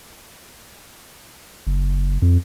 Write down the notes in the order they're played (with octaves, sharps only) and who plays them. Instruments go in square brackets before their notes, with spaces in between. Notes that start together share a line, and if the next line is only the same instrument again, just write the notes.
[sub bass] F#1
F2